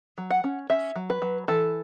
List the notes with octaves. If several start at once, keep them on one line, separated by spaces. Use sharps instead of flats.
F#3
F#5
C#4
C#4 E5
F#3
B4
F#3
E3 A4